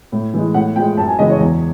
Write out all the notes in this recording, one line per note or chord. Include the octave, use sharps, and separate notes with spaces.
A2
E3 G#3
A2 F#5
F3 G#3 G5
F#2 A5
G#5
C#3 E3 G#3 D#5
C#5
E2